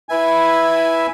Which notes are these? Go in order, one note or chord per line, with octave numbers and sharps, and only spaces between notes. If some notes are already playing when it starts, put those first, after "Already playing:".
E4 B4 E5 G#5